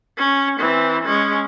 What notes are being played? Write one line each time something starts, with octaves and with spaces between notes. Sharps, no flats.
C#4
E3 C4
G#3 C#4